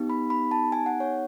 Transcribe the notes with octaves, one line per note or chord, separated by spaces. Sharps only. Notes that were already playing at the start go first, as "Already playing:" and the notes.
Already playing: B3 D#4 G4
B5
B5
A5
G#5
F#5
C#5